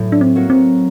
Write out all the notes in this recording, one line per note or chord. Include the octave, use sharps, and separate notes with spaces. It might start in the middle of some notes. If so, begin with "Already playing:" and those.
Already playing: A2 F#3 F#4
D4
C4
F#3 A#3 F#4
C4